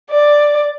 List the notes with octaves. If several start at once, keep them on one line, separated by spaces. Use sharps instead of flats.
D5